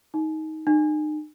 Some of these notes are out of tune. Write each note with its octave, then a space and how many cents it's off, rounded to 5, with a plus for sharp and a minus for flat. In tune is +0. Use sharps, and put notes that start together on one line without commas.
D#4 +15
D#4 -35